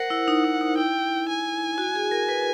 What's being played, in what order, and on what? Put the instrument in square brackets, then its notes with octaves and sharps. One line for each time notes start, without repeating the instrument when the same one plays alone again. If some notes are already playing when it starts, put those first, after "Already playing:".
Already playing: [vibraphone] A#4 C5 [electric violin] F#5
[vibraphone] E4
D#4
D#4
D#4
[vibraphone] E4 [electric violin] G5
[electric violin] G#5
[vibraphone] F#4
G#4
A#4
B4